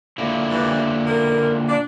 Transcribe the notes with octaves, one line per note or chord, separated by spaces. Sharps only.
A#2 D3 E4
G2 D#3 E3
A#3 B3 A#4
D4